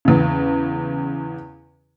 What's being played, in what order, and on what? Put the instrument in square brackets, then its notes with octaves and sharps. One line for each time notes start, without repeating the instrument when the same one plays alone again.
[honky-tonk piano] E2 C#3